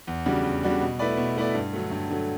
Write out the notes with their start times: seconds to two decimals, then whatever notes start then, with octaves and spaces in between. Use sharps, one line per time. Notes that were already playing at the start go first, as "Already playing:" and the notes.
0.07 E2
0.26 C#3 G3 D4 F#4
0.44 E2
0.63 C#3 G3 D4 F#4
0.81 B2
0.99 A3 E4 B4 D5
1.17 B2
1.37 A3 E4 B4 D5
1.54 G2
1.73 D3 F#3 A3
1.91 G2
2.10 D3 F#3 A3